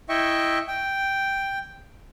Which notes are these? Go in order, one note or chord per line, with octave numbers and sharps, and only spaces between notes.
E4 D#5 E5 G5 C#6
G5